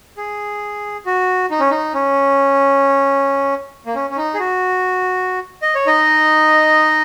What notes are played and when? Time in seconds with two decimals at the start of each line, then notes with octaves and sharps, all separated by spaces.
0.17 G#4
1.06 F#4
1.50 D#4
1.60 C#4
1.71 D#4
1.94 C#4
3.86 A#3
3.95 C#4
4.10 C#4
4.17 D#4
4.34 G#4
4.39 F#4
5.62 D#5
5.75 C#5
5.87 D#4 D#5